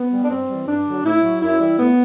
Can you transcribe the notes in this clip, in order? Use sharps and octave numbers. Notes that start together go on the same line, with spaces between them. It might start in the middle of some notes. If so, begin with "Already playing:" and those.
Already playing: B3
G3
D4
G2 C4
E3 G3
G2 D4
D3 F#3
A2 E4
F#3
F#2 E4
E3 G3
A2 B3